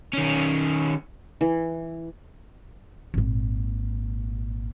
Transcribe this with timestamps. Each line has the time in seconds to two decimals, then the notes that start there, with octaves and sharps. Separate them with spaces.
0.13 D#3 C#4
1.41 E3
3.14 G#1 A#2